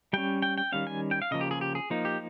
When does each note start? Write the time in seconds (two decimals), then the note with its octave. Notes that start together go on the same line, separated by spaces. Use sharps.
0.13 G3 C#4 G5
0.42 G5
0.58 G5
0.72 D#3 G3 C#4 F5
0.87 G#5
1.11 G5
1.22 F5
1.31 C#3 F3 A#3 D#5
1.41 G4
1.51 G#4
1.61 G4
1.75 G#4
1.90 F3 A#3 D#4
2.05 G4